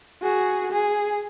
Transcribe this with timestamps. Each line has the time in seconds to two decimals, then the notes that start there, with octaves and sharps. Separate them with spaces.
0.22 F#4 G#4
0.71 G#4